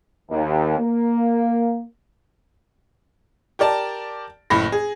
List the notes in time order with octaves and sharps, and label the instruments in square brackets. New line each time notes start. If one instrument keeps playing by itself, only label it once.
[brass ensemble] D#2
A#3
[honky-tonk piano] G4 A#4 D5 A5
F#1 A2 B5 A#6
G#4